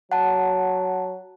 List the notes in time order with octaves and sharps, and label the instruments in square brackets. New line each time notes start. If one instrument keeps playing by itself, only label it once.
[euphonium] F#3 [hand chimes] F#5 A5